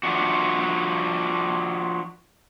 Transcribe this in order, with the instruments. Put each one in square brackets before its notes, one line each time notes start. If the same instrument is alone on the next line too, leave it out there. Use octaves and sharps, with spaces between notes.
[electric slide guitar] F3 D4 F#4